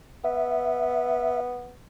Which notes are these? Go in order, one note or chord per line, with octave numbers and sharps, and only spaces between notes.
B3 E5